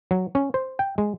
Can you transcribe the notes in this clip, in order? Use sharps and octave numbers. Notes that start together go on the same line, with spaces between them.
F#3
C#4
C5
G5
G#3